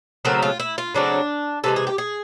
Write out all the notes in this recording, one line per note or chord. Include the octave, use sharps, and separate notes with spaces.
C#3 F#3 A3 C4 A#4
F4
E4
F4
C#3 F#3 A3 C4 D4
C3 E3 G#3 A4
G#4
G4
G#4